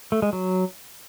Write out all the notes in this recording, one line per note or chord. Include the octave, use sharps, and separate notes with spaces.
A3
G#3
F#3